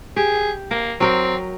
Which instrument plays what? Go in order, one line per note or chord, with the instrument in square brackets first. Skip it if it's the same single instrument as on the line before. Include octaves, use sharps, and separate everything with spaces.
[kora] G4 [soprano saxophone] G#4
[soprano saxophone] A#3 [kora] A#4
[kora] F#3 A#4 G5 [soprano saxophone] C4